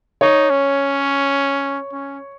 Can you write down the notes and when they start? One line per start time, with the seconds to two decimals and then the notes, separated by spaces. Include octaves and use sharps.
0.21 D#4 C#5
0.50 C#4
1.92 C#4